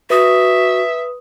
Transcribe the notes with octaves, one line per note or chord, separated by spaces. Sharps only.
F#4 B4 E5 D#6